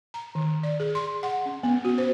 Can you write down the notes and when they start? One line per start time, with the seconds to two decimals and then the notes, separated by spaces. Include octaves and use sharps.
0.14 A#5
0.35 D#3
0.63 D5
0.80 G#4
0.95 C6
1.23 F#5
1.46 C#4
1.63 B3
1.85 F#4
1.98 C5